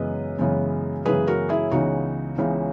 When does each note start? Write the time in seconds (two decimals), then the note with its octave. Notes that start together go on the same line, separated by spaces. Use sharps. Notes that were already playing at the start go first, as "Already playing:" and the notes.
Already playing: F#2 C#3 E3 G#3 B3 B4 D#5
0.38 F#2 C#3 E3 G#3 B3
1.05 F#2 C#3 E3 G#3 B3 G#4 B4
1.27 F#4 A#4
1.49 E4 G#4
1.71 C#2 C#3 E3 G#3 B3 D#4 F#4
2.38 C#2 C#3 E3 G#3 B3